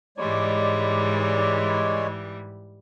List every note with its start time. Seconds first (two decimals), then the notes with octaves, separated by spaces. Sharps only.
0.18 G#2 E3 G3 G#3 C#5 D5